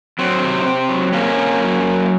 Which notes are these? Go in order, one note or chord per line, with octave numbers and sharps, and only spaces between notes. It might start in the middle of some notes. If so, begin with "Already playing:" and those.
F#3 C4
C3
C3
F#3
C3 A#3 C#4
C3
F#3
F#3